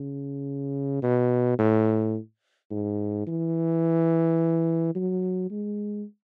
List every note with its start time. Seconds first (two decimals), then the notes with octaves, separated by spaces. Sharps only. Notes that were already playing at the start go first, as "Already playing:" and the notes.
Already playing: C#3
1.02 B2
1.59 A2
2.71 G#2
3.27 E3
4.95 F#3
5.50 G#3